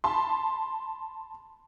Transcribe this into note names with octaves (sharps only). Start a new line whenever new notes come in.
A5 B5 C6